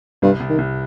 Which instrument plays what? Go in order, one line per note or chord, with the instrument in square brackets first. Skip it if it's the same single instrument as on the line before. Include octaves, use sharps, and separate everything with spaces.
[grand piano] C2 [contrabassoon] G2
[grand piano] C2
[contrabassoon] D#3
[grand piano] C2